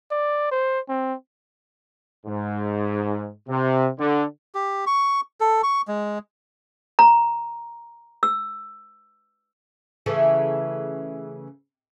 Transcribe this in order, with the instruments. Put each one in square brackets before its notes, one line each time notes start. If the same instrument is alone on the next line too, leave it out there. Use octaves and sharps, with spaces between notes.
[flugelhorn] D5
C5
C4
[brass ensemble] G#2
C3
D3
[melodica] G4
C#6
A4
C#6
G#3
[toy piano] A#5
E6
[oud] C#3 E3 A3